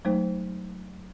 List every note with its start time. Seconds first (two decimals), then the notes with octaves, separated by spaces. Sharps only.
0.05 F#3 G#3 A3 D#4 C5